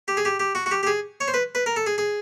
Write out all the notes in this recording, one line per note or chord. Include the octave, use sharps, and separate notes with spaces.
G4
G#4
G4
G4
F#4
F#4
G4
G4
G#4
C#5
C5
B4
B4
A#4
A4
G#4
G#4